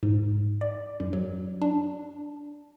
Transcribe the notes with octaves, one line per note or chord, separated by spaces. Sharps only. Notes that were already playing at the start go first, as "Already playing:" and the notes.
G#2
D5
F#2
F#3
D4